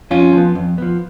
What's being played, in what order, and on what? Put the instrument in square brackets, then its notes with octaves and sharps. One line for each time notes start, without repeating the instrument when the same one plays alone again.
[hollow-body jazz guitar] F2 C#4 F4
F3 B3
F2
F3 B3